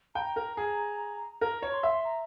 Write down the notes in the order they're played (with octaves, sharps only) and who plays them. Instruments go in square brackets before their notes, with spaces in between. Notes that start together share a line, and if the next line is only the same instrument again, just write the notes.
[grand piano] G5 [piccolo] A#5
[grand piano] A#4
G#4
[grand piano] A#4 [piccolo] A#5
[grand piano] C#5
[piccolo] C6
[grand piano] E5
[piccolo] A#5